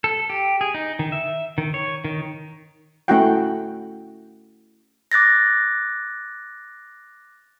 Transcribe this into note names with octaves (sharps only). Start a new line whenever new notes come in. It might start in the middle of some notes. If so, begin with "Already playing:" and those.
A4
G4
G#4
D#4
D#3
E5
D#3
C#5
D#3
A3 C#4 E4 F#4 F#5 G5
D6 F#6 A6 A#6